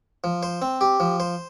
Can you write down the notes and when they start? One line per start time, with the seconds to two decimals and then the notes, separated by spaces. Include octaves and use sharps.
0.24 F3
0.43 C5
0.62 C4
0.81 G4
1.00 F3
1.20 C5